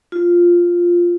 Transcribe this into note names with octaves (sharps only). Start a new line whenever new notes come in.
F4